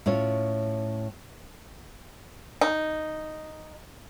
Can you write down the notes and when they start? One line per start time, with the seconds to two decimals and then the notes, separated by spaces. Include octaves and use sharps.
0.06 A2 C#4 F4 C#5
2.61 D#4